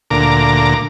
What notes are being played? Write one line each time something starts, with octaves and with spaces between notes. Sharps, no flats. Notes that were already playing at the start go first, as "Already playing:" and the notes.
D2 A#2 A#5 D6